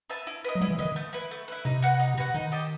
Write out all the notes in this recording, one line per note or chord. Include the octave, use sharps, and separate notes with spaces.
B4 E5 A5
E4
B4 D#5
F#3
G3 E4
E3
D#3 B4 D#5
A3
E4 B4
A3
E4 B4
C3 D#4
F#4 B4 F#5
D#4
F#4 B4 F#5
D#3 D#4
G4 D#5 A5